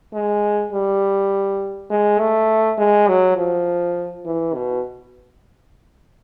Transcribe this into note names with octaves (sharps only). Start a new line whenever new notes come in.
G#3
G3
G#3
A3
G#3
F#3
F3
E3
B2